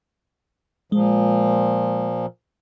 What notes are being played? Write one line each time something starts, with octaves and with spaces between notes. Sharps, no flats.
A#2 F3 G#3